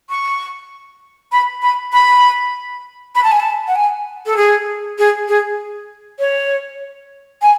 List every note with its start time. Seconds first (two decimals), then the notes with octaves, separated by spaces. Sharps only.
0.10 C#6
1.32 B5
1.62 B5
1.93 B5
3.15 B5
3.23 A5
3.31 G#5
3.40 A5
3.67 F#5
3.75 G#5
4.26 A4
4.36 G#4
4.98 G#4
5.28 G#4
6.19 C#5
7.42 G#5